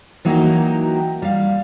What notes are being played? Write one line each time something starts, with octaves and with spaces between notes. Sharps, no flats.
E3 F#3 A#3 D#4 F#4 G4
G3 F5